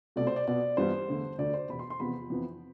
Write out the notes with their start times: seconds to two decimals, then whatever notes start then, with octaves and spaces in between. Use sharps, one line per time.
0.16 C2 B2 A3 D5
0.27 C5
0.36 D5
0.47 B2 B3 D5
0.77 G2 E3 G3 B3 C5
1.08 E2 D3 A3
1.38 D2 D3 A3 D5
1.54 C5
1.69 E2 B2 B3 B5
1.79 C6
1.90 C6
2.00 E2 C3 F3 B3 B5
2.30 F2 E3 B3